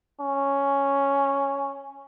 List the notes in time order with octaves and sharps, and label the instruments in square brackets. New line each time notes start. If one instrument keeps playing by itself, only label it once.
[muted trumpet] C#4